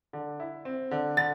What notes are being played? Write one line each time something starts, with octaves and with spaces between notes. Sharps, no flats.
D3
E4
C4
D3
D3 A6